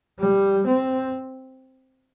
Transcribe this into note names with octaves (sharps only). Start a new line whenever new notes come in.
G3
C4